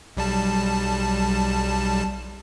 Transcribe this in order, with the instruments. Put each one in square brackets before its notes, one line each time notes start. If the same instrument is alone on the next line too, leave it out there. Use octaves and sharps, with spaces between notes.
[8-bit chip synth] B1 G3 A5